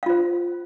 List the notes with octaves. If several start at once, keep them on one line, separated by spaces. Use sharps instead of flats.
F4 C5 F5